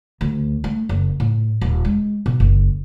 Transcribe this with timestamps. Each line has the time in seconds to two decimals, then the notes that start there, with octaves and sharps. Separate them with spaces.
0.21 D2
0.64 A3
0.89 F#1
1.20 A2
1.61 D#1
1.85 G#3
2.26 B2
2.40 F#1